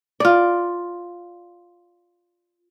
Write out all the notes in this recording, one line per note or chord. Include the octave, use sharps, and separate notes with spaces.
F4 D5